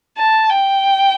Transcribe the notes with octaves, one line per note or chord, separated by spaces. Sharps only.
A5
G5